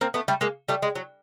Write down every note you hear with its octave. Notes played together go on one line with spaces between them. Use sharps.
A#3 C4
A3 B3
G3 A3
G#3 A#3
G3 A3
G#3
F#3